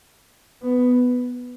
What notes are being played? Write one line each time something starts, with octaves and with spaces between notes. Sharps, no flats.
B3